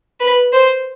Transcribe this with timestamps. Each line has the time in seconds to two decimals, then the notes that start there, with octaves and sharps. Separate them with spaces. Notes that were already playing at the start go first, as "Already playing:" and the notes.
0.20 B4
0.52 C5